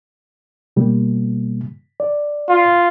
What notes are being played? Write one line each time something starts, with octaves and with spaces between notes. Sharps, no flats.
B2 G3 A#3
D5
F4